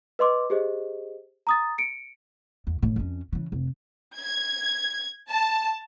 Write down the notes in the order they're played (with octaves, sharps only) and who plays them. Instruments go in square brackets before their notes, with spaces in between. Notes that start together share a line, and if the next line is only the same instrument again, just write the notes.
[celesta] B4 D#5 C6 D6
G4 G#4 C5 D#5
A#5 D#6 A6
C#7 D7
[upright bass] E2
A1 A2
F2 C#4
C#3 E3
F1
[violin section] G#6
A5